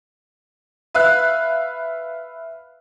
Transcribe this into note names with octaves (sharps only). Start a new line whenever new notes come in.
B4 E5 F5 F#6